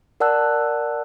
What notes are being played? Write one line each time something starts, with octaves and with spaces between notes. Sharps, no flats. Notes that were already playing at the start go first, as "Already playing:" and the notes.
A#4 D5 F#5 A5 E6 F#6